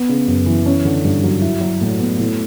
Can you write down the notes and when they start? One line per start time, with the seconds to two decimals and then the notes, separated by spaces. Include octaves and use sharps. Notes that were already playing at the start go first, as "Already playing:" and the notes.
Already playing: B3
0.09 C#3
0.27 F#2
0.46 E3
0.66 C#4
0.85 D3
1.04 G2
1.24 F#3
1.42 E4
1.61 F#3
1.81 A2
2.00 B3
2.19 A2